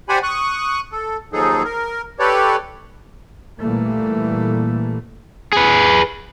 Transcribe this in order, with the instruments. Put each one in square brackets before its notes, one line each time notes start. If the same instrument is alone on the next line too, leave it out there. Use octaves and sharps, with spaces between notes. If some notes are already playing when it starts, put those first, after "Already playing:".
[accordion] G4 C5 D5 F#5 G#5 B5
C#6 D#6 F#6
A4
D#2 F3 F#3 D#4 G#4 A4
A#4
G4 A4 B4 C#5 D5
[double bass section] A#2 E3 G3 A3 A#3
[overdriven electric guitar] G#4 B4